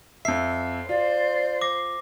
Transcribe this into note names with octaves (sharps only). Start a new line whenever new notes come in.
F2 E5 C7
F4 C5 D5
D6 A#6